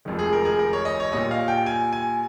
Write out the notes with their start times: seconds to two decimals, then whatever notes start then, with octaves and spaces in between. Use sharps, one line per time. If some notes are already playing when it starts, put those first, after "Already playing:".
0.05 F1 F2 D#3 G#3
0.19 G#4
0.33 A#4
0.45 G#4
0.59 A#4
0.73 C#5
0.85 D#5
1.00 C#5
1.12 A#1 A#2 G3 D#5
1.31 F5
1.48 G5
1.66 G#5
1.93 G#5